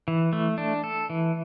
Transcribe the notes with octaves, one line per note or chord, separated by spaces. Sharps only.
E3
A3
D4
A4
E3